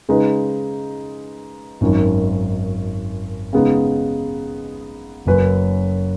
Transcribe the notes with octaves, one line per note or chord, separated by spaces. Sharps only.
C#3 G#3 D#4 B4
G#1 F#2 D#3 F#3
C#3 G#3 B3 D#4
F#1 F#2 F#3 C#4 B4